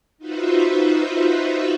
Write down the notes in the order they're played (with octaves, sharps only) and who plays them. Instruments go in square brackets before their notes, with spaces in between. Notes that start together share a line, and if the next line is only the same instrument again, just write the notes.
[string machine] D#4 F4 F#4 B4 C5 E5